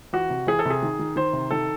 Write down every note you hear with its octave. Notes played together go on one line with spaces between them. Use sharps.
E3 F#4
C3
E3 G#4
A4
C3 G#4
D#3
D#3
D#3 C5
C3
D#3 A4